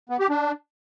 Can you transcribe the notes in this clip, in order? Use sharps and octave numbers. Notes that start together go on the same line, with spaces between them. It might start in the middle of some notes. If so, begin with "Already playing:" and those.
B3
G4
D4